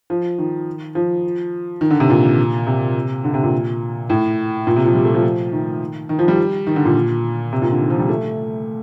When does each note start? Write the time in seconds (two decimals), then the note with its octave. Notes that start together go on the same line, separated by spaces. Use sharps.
0.10 F3
0.38 D#3
0.95 F3
1.81 D#3
1.91 D3
2.00 C3
2.10 A#2
2.67 C3
3.24 D3
3.34 C3
3.43 A#2
4.10 A2
4.67 A#2
4.76 C3
4.85 F3
4.95 G3
5.05 A3
5.14 F3
5.52 D#3
6.09 D#3
6.19 F3
6.28 G3
6.67 D#3
6.76 D3
6.85 A#2
7.53 C3
7.62 A#2
7.71 D3
7.81 D#3
7.90 F3
7.99 G3
8.09 A3